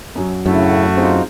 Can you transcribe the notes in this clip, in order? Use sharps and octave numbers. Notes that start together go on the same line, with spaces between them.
F#2 F#3
F#2 A2 C#3 A3 D4 E4 F#4
C4 D4 D#4 F4 G#4